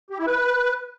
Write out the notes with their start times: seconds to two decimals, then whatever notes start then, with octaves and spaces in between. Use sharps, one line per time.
0.10 G4
0.18 E4
0.27 B4